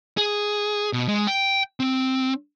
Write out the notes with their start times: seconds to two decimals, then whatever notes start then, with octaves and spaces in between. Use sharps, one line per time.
0.17 G#4
0.93 B2
1.08 G#3
1.27 G5
1.80 C4